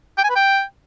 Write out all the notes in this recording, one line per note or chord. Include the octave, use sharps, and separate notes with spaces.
G5
G#5
B4
G5